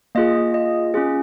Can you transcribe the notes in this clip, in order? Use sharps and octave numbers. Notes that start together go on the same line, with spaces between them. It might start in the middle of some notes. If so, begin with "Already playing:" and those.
A#3 F4 G#4 D#5
D#5
C#4 F4 G#4